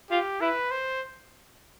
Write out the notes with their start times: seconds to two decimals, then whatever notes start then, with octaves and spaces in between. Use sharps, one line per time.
0.10 F4 G4
0.41 E4 B4
0.71 C5